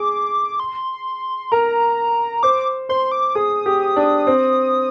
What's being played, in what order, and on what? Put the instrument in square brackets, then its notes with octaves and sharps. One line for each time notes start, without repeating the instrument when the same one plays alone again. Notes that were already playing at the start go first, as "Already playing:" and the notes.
Already playing: [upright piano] G#4 [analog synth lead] D6
[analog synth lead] C6
[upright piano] A#4 [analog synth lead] A#5
[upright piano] C5 [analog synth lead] D6
[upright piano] C5 [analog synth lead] C6
[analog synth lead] D6
[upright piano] G#4 [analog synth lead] D#6
[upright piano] G4
D4
C4